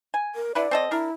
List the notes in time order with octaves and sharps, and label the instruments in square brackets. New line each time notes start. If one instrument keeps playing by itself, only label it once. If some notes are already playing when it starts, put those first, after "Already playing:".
[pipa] G#5
[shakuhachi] A#4
[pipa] D3 E4 B4 [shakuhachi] D5
[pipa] C4 A4 D#5
[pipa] D4 A#4 [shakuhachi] E4